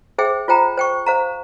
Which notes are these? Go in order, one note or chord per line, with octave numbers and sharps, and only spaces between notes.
G#4 C5 E5 G5
F4 C5 G5 A#5
C5 G5 C#6
C5 F5 A#5